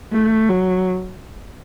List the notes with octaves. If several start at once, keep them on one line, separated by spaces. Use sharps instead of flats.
A3
F#3